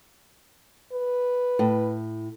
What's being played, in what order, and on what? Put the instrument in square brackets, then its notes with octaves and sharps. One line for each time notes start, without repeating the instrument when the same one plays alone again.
[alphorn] B4
[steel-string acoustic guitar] A2